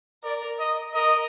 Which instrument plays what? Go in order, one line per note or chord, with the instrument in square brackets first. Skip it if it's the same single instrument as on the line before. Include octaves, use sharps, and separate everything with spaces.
[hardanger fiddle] A#4 [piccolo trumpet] D5
[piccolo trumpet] D#5
[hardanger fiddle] A#4 [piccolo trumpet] D#5